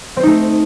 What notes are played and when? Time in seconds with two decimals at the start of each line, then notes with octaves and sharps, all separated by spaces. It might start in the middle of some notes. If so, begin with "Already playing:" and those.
0.17 C4
0.20 C5
0.23 D#4
0.27 A3